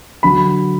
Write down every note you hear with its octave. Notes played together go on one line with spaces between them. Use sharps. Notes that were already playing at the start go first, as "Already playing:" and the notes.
D3 F#3 B5